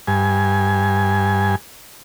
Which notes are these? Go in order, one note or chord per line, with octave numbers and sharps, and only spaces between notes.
G2 G#5